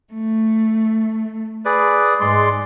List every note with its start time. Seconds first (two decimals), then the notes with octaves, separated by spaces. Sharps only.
0.13 A3
1.65 G#4 B4 D5
2.21 G#2 G#3 D5 C6